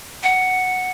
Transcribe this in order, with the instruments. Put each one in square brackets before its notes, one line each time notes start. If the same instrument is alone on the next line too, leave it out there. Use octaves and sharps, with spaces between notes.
[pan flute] F#5